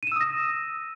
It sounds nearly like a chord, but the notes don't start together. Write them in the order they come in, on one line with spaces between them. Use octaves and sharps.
D#7 E7 E6 D#6 A#6